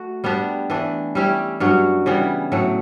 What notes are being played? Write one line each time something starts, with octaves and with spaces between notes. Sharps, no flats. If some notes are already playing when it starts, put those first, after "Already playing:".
Already playing: A3 F#4
G3 B3 D4 G4
E3 A3 D4
G3 C#4 E4 G4
G2 F#3 C#4 F#4
C#3 E3 G3 B3
A2 F#3 A3